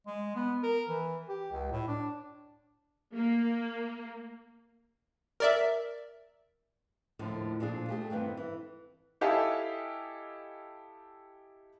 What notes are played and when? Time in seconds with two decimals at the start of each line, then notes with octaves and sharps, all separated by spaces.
0.07 G#3
0.36 B3
0.63 A#4
0.89 E3
1.29 G4
1.52 C#2
1.72 A2
1.88 D4
3.15 A#3
5.40 A#4 D5 E5
7.19 D#2 A2 D3 F3
7.60 A#2 F3 D4 G#4
7.89 A3 G4 G#4
8.10 G2 D#3 E3 B3 C4
8.37 E3
9.21 E4 G4 A4 D#5 F5 G#5